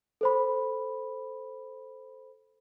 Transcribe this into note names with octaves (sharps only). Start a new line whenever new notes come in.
A4 C5 B5